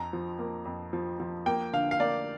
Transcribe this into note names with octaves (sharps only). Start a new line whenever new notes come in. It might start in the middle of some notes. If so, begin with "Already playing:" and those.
Already playing: F2 A#5
F3
A#3
F2
F3
F3
A#3 G5
D3 F5
F5
A#3 D5